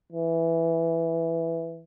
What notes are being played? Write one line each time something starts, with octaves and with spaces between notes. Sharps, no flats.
E3